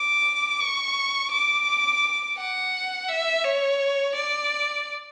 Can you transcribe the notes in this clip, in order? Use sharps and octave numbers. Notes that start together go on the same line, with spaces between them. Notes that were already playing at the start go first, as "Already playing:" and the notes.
Already playing: D6
C#6
D6
F#5
E5
C#5
D5